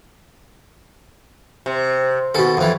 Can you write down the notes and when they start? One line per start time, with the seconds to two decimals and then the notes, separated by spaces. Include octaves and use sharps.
1.66 C3
2.35 D#2 B2 A4
2.57 F2 E3